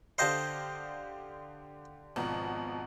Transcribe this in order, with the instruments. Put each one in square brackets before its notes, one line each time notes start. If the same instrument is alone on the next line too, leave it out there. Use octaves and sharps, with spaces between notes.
[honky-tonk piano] D3 G4 F5 [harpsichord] C5 D#5 A5
[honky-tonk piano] G#1 B2 F3